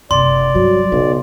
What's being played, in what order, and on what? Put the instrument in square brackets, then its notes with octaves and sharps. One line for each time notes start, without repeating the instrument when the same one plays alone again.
[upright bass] F#1 C3 [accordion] D5 [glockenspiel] C6
[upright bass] G2 [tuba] F#3
[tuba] B1 [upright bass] C#3